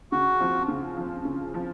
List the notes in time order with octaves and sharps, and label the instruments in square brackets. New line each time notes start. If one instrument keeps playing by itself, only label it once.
[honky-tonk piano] C#3 [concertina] F#4
[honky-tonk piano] F3 C4
C#3
F3 C4
C#3
F3 C4